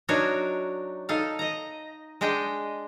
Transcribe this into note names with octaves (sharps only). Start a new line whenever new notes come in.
F#3 D4 D#4 F#4 A#4 C#5
D#4 A4 F5
D#5 A#5
G#3 D4 D#5 G5